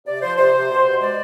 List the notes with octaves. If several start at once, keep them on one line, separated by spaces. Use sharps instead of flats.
C3 D5
F3 C5
C3 C5
C3
B2
B2
G#3 D5